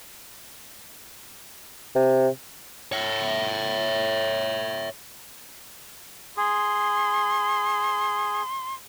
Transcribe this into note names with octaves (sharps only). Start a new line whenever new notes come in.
C3
C#5 E5
G#4 C6